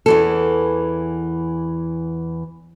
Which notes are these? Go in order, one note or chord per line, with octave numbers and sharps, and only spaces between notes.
E2 E3 A4